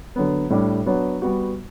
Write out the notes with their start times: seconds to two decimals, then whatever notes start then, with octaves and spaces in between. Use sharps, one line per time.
0.16 D3 F#3 B3
0.50 A2 G3 D4
0.86 F#3 B3 D4 F#4
1.22 G3 B3 F#4